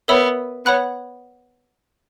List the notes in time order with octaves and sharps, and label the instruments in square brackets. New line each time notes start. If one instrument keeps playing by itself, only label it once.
[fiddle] B3 [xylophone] A#4 C#5 E5 B5 E6
[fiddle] B3 [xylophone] C#5 F#5 B5 F#6